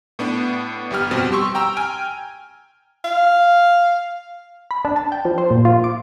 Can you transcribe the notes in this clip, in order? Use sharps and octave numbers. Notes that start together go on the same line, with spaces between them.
A2 B3 D4
G1 G3 B3 G4 F6
F2 B2 G3 C4
G4 C6 C#6 E6
G5 A#5 E6
G5 G#5 F6
F5
B5
D4
A5
G5
F3
C5
A#2
F4
D6